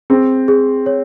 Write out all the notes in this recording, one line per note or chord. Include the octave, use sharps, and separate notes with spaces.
C4 G#4
G#4
C#5